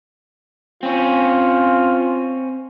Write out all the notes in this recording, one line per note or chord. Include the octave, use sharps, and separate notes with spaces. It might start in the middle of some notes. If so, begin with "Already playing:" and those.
C4 C#4 F4